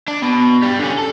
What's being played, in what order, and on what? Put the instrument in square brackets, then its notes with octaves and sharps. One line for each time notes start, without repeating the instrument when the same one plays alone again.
[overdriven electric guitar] D4
B2
G2 G3
D3 C#4
A4